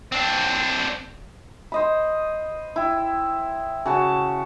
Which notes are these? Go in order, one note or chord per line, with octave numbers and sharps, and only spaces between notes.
C4 D4
C5 D#5 B5
E4 G5
C#3 F#4 A5